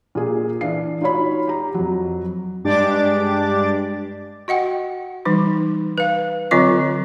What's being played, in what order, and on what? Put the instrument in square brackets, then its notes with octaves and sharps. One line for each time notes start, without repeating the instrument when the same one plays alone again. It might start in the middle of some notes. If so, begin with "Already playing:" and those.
[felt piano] A#2 G#4
E3 D4 F5 C7
D#4 F4 F#4 C#5 B5
G4 A#5
F2 F#3
[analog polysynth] G2 G#3 D4 G4 D6 A6
[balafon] F#4 D#5 F#5 G5
E3 G3 D#4
B4 F5
D3 F#3 C4 F4 D#5 C#6